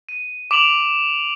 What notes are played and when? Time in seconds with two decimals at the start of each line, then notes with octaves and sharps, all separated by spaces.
0.09 D#7
0.51 D6 D7 F7 F#7